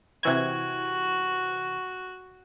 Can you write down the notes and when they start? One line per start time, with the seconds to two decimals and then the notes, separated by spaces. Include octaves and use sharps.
0.23 C3 E3 F#4 G#6